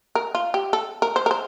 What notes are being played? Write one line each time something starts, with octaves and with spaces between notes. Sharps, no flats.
A#4
F4
G4
A4
A#4
C5
A#4
C5